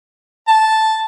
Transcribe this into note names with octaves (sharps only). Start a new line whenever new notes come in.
A5